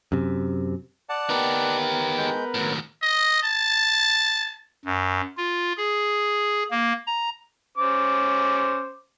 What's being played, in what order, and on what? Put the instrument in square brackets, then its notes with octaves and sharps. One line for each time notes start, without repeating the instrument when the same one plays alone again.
[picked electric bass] F#2 C3
[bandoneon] D5 F#5 A5
[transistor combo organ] B3 A#4 B4 [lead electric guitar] D#4 G4
[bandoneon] G#3 G6
[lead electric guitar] D#2 A2 [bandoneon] F#3
[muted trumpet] D#5
A5
[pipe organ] F#2
F4
G#4
A#3
A#5
[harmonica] C#4 C5 D6